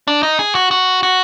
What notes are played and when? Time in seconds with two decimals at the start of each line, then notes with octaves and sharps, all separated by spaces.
0.08 D4
0.23 D#4
0.39 G#4
0.55 F#4
0.71 F#4
1.03 F#4